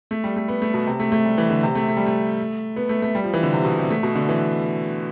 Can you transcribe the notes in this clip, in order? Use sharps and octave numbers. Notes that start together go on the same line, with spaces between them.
A3
G3
A3
B3
A3
B2
C3
A3
A3
G3
E3
D3
C3
A3
A3
G3
A3
B3
A3
A3
G3
F3
E3
D3
C3
B2
C3
A3
B2
D3
E3